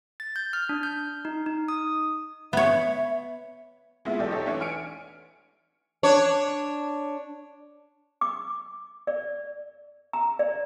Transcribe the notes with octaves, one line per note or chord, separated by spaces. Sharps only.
A6
G6
F6
D4
G6
D#4
D#4
D#6
B3 C#5 E5
G#3 A3 B3 E4 F4
B1 E2 G4 A4 D5
D#4 E4 G4 A4 C#5
E3 A3 D4 C#5
G#5 F6 C#7 D7
D4 C#5
D6
D5
A#5
D5